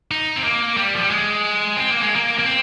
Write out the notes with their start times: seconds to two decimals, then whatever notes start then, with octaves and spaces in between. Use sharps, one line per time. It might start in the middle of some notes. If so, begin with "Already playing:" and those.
0.11 D#4
0.36 C4
0.44 A#3
0.77 G3
0.94 F3
1.02 G3
1.10 G#3
1.77 C4
1.90 A#3
2.03 G#3
2.16 A#3
2.39 A#3
2.43 C4